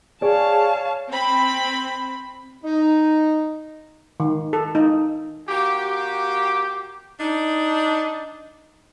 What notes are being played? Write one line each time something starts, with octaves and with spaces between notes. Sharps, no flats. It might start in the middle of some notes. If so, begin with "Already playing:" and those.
G#4 C#5 D5 F5 A5
C4 B5
D#4
D#3
A4
D#4
A#3 F#4 G4
D4 D#4